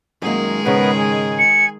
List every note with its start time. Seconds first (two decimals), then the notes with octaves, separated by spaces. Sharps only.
0.22 F#2 D#3 G#3 A#3 G#4
0.65 G#2 C#3 B3 A#4 B4
1.00 G#5
1.39 C#7